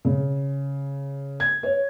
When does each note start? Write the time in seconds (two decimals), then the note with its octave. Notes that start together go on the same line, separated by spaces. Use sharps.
0.05 C#3
1.40 G#6
1.63 C#5